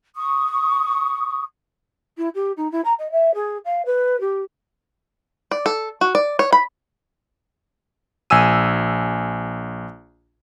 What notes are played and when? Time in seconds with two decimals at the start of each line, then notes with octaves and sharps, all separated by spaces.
0.16 C#6 D#6
2.17 E4
2.34 G4
2.56 D#4
2.71 E4
2.84 A#5
2.99 D#5
3.11 E5
3.34 G#4
3.65 F5
3.85 B4
4.20 G4
5.51 D5
5.66 A4
6.01 F#4
6.15 D5
6.39 C#5
6.53 B5
8.30 A#1 G#5 E6 D#7